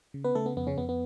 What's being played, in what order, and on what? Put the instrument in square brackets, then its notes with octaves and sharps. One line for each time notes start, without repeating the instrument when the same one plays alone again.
[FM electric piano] C#3
B3 B4
C#3 A3 A4
B3
F2 B3
C#3 C#4
F2 B3
B3